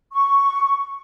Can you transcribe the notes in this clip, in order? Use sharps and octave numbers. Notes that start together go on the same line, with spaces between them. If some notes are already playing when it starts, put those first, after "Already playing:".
C#6